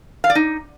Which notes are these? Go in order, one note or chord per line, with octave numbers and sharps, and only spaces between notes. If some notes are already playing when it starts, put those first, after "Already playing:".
F5
D5
D#4